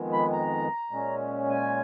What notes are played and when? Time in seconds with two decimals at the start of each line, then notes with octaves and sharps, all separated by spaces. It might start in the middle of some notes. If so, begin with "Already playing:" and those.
Already playing: F2 D#3 G#3 B3
0.13 B5
0.33 A#5
0.91 A#2 G#3 C#4
1.50 G#5